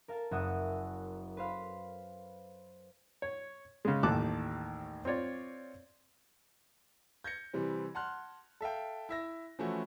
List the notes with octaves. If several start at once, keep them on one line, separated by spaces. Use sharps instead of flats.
A#4 F5 A5
F#1 F#4 E5 F#5 D#6
B4 C5 F5 B5
C#5
C#3 G#3
A1 D#2 A3 A5 D6 F#6
C4 F4 C#5 D5
G6 G#6 A#6 C#7
C3 E3 G3 C4
F#5 A5 C6 F6 F#6
A4 E5 F5 G5
E4 E5 A#6
E3 F3 A3 C#4 E4 F#4